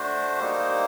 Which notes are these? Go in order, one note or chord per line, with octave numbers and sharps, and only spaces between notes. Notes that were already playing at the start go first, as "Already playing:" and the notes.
Already playing: A3 D4 F#4 C5
G3 A#3 D#4